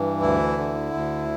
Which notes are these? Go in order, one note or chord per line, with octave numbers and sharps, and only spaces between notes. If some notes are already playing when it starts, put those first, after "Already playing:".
Already playing: G2 E3
D2 E4
D3
D2